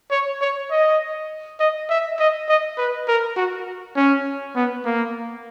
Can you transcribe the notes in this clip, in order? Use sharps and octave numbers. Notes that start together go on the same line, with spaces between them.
C#5
C#5
D#5
D#5
E5
D#5
D#5
B4
A#4
F#4
C#4
B3
A#3